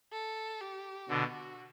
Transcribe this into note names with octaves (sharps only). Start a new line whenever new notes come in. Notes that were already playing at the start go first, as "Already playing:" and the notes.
A4
G4
B2 D3 F#4